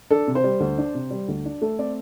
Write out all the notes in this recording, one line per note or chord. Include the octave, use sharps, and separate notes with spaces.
D4 A4
C3
C5
G3
D2
D4
C3
G3
D2
D4
A3 A4
C4 D5